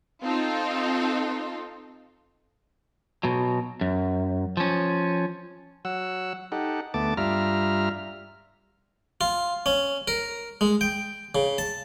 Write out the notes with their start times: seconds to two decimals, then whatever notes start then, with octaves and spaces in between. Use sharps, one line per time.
0.22 C4 D#4 F4 A4
3.23 B2 F#3
3.81 F#2
4.57 F3 C#4
5.85 F#3 F#5 E6
6.52 D#4 G4 A4 F#5
6.94 D2 A3 B3 A5 D6
7.17 G2 G3 F4 E5 A#5 F6
9.21 F4
9.66 C#4
10.08 A#4
10.61 G#3
10.81 G5
11.35 C#3
11.58 A5